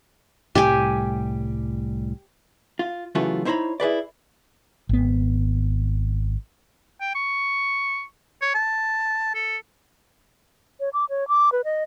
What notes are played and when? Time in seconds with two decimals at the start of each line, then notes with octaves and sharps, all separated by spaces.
0.55 C2 A2 G3 G4 G#5
2.79 F4
3.15 F#2 C#3 E3 A3 F4 F#4
3.45 D#4 E4 C5 C#5 A#5 B5
3.80 E4 G#4 B4 D5
4.89 G#1 B3
7.01 G5
7.15 C#6
8.42 C#5
8.54 A5
9.35 A4
10.80 C#5
10.93 D6
11.09 C#5
11.28 D6
11.52 B4
11.64 D#5